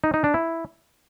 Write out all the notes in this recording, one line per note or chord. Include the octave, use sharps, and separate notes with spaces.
D#4
D#4
D4
E4